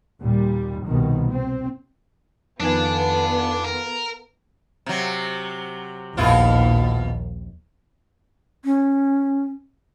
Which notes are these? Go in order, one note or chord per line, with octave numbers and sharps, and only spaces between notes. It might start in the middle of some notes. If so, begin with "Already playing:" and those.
D#2 A#2 G3
C2 B2 D#3
C4
F2 D#3 B3 D4 F4 A4 G#5
A#4
C3 F#3
A#1 D#2 B2 E4 F4
C#4